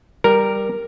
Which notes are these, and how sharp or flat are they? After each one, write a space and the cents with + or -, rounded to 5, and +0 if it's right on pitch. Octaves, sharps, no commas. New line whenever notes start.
G3 +5 A#4 +0